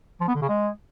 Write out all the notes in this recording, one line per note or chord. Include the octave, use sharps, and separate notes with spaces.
F3
B3
D3
C#3
G#3